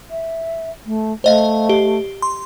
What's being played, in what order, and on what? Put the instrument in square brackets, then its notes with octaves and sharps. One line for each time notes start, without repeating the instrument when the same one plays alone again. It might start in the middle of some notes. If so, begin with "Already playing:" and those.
[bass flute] E5
A3
[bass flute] A3 [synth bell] C5 D#5 F5
[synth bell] G4
C6